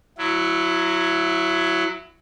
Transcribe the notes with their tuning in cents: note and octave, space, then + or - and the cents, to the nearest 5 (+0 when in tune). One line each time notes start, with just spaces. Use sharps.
F#3 +0 E4 +20